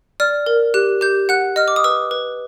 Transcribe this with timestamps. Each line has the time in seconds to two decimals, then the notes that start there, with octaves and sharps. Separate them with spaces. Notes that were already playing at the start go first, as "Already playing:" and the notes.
0.20 D5 F6
0.46 A#4
0.74 G4 F#6
1.01 G4 G6
1.29 F#5 F#6
1.56 D#5 F6
1.68 D6
1.76 D#6
1.84 B4 E6
2.11 B4